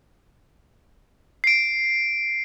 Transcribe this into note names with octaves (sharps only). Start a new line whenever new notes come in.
C7 D7